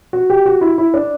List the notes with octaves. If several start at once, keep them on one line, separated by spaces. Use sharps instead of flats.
F#4
G4
F#4
E4
E4
D4